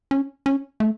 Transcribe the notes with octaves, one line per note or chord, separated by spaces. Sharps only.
C#4
C#4
A3